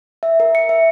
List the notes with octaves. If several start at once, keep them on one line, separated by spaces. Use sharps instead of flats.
E5
A#4
C#7
E5